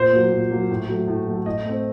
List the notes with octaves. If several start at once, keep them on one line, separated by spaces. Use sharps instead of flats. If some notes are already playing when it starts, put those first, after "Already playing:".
Already playing: A#2 C5
F#3 A#3
A#2
F#3 A#3
A2
F#3 A3
A2
F#3 A3
A2 D#5
A3 C4